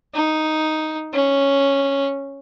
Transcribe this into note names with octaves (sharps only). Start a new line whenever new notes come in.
D#4
C#4